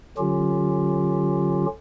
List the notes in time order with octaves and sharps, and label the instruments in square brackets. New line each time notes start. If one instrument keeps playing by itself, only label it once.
[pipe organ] D3 F#3 C#4 F4 G4